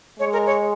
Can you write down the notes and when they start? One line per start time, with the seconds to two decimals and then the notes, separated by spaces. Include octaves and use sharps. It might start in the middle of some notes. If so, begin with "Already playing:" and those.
0.19 G#3 C#5
0.33 A#4
0.46 C#5